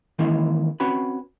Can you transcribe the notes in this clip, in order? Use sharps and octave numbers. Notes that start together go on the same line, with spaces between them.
D#3 E3 G#3 A#3 C#4 E4
C4 C#4 F#4 B4 B5